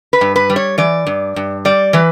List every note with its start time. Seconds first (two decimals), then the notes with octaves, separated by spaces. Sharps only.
0.13 B4
0.21 G2
0.36 B4
0.50 G3
0.56 C#5
0.78 E3 D5
1.07 G2
1.36 G2
1.65 G3 D5
1.93 E3 B4